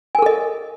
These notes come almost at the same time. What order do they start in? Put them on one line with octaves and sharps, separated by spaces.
G#5 A#4 A4 D#5